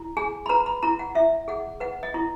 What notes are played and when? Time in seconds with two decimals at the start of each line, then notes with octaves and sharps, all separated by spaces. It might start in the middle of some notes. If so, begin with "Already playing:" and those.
Already playing: E4
0.17 G#4 G#5
0.46 B5
0.49 B4 A#5
0.66 B5
0.83 E4 A#5
0.99 F#5
1.15 E4 E5
1.48 G#4 F#5
1.80 B4 F#5
2.03 D#5
2.14 E4